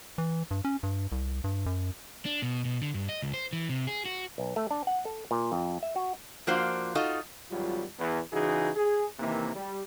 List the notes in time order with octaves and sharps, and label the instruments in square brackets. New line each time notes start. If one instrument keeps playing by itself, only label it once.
[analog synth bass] E3
G2
C#4
G2
C2
G2
F#2
[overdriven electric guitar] D4
B2
B2
D3
G2
D#5
C#2
C5
E3
C3
G#4
F#4
[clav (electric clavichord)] B1
A3
D4
F#5
A4
A#2
F2
E5
F#4
[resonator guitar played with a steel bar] F3 A#3 D4 F4 F#4 C5
D#4 F4 F#4 A4 D#5
[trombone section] G#1 F#3 G3 F4
E2
C#3 E3 D#4 F#4 G#4
G#4
C3 D#3 E3 A#3
G3